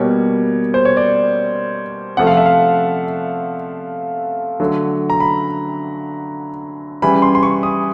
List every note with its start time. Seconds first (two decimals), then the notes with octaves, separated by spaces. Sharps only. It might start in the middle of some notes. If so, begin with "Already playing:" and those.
Already playing: B2 G3 A#3 C#5
0.74 C5
0.85 C#5
0.97 D5
2.17 C3 F3 A3 F#5
2.27 F5
2.37 E5
2.46 F5
4.60 D3 F#3 A3
5.10 A#5
5.20 B5
7.02 C#3 E3 G3 B5
7.22 C6
7.35 C6
7.43 C#6
7.63 D#6